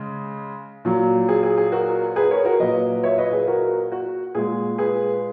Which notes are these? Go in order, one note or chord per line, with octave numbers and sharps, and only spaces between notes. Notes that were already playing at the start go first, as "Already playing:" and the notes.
Already playing: C#3 G#3
A#2 F#3
G#4
G#4
G#4
F#4 A#4
G#4 B4
A#4 C#5
F#4 A#4
A#2 F#3 B4 D#5
C#5 E5
B4 D#5
G#4 B4
F#4 A#4
F#4
A#2 G#3 G#4
G#4 B4